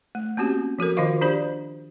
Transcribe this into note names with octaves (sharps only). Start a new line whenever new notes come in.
A3
A#3 C4 C#4 F#4 G4
F3 F#4 A4 A#4
D#3 F4 F#4 D#5 F5 C#6
D4 G4 C5 D5 D#5 B5